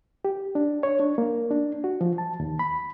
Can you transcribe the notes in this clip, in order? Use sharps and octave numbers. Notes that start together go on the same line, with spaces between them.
G4
D4
C#5
D4
A#3
D4
F#4
F3
A5
D#2
B5